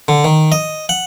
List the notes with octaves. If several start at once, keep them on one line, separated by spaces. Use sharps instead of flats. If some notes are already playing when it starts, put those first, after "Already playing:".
D3
D#3
D#5
F#5